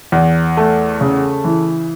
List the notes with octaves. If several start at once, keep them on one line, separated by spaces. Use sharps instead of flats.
E2
A3
C#3
E3